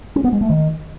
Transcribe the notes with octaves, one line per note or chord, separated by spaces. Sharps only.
C#4
B3
G#3
A3
D#3